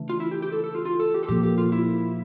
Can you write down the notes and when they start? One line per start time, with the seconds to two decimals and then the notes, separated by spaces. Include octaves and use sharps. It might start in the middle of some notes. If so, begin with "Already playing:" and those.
Already playing: C#3 E3 A3 D4
0.09 F4
0.20 E4
0.31 G4
0.42 G4
0.52 A4
0.64 A4
0.75 F4
0.85 F4
1.00 A4
1.14 G4
1.23 A4
1.28 A#2 F3 A#3 G4
1.43 G4
1.58 F4
1.72 E4